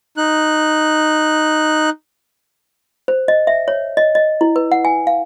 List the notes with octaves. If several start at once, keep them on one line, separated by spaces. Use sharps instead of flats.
D#4 F#6
C5
D#5
E5
C#5
D#5
D#5
E4
B4
F#5
G#5
F5